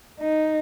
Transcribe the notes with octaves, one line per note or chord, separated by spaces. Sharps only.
D#4